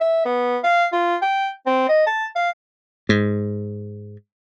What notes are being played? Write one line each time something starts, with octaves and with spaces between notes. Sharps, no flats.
E5
B3
F5
F4
G5
C4
D#5
A5
F5
G#2